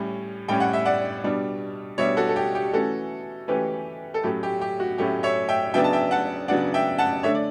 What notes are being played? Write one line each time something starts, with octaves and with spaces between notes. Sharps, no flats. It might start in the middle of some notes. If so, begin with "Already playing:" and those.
Already playing: A2 G3 C#4
A2 G3 C#4 G5
F#5
E5
D5 F#5
B2 G3 D4
B2 G3 D4 C#5 E5
F#4 A4
A4
G4
G4
E3 A3 C#4 F#4 A4
E3 A3 C#4 G4 B4
A4
A2 F#3 A3 C#4 G4
G4
G4
F#4
A2 F#3 A3 C#4 G4
C#5 E5
E5 G5
C#3 F#3 B3 D4 E5 G5
A5
E5 G5
F#5 A5
C#3 F#3 B3 D4 D5 F#5
E5 G5
F#5 A5
D3 A3 D4 C#5 E5
D5